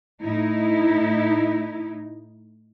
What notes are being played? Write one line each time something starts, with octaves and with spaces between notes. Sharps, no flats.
A2 D#4 E4